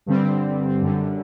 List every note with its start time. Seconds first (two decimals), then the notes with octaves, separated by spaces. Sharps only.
0.06 G2 D3 G3 C4
0.82 F#2 D3 G3